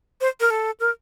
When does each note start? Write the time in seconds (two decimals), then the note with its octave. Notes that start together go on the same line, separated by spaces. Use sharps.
0.21 C5
0.40 A#4
0.50 A4
0.80 A#4